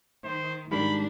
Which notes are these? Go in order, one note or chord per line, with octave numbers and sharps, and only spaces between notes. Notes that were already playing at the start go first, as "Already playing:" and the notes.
D#3 C5
G#2 D#3 G3 G#3 D4 B5